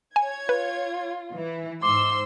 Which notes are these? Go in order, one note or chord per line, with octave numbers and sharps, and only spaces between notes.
C#5 G#5 G#6
F4 B4
E3 E4
G#2 C5 C6 D6 E6